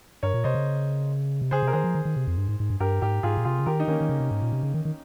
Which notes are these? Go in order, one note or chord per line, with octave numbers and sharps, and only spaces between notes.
G2 A#4 C#5
A#2
C3 C5 D#5
C#3
C3
C#3 G#4 C5
C3
A#4
D#3 G#4 C5
F3
D#3
D#3
C3
F2
G2
G#2
G#2
G2
G2 G4 A#4
G#2 G4 A#4
G#2 F4 G#4
A#2
C3 F4 G#4
C#3
D#3 G4 A#4
D#4
D#3 A#3 C#4
D#3
C#3
C3
G#2
A#2
C3
C#3
D#3
D#3